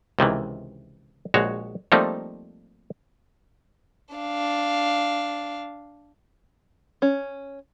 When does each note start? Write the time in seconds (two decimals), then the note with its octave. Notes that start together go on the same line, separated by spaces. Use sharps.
0.19 C#2 C3 D#3 E3
1.34 A#1 G#3 F#4 C#5
1.92 F3 G3 A3 A#3 C4 D#4
4.15 D4 F5
7.02 C#4